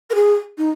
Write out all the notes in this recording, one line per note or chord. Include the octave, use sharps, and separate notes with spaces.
A#4
G#4
D#4